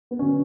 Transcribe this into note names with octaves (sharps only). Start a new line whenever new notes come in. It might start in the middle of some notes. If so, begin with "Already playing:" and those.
B3
D3 F#3 C#4